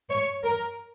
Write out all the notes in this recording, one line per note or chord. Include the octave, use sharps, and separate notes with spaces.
C#5
A#4